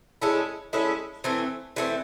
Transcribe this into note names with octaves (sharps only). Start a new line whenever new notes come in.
G#3 C#4 E4 A4
G#3 C#4 E4 A4
E3 A3 C4
E3 A3 C4